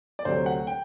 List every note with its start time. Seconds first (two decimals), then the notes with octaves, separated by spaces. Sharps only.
0.19 D5
0.25 D2 C3 F#3 C5
0.46 F#5
0.67 G5